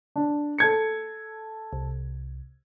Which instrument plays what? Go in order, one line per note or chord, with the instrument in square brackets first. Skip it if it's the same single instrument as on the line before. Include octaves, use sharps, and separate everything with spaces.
[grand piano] D4
A4 G#6 C#7
[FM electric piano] C2